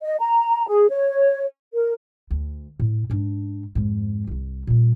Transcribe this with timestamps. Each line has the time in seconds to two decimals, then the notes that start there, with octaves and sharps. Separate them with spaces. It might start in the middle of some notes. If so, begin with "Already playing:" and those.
0.02 D#5
0.20 A#5
0.67 G#4
0.90 C#5
1.73 A#4
2.31 D2
2.80 A2
3.10 G#2 D4
3.75 F2 G#2
4.27 E1 C2
4.67 A#2 G3